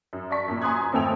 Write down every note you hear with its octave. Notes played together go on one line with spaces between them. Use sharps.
F#2
D5 A5 C#6 B6
F#2 A#2
G#5 A#5 C6 D#6 F#6 G#6
G#1 F2 A3 A4 G5 F7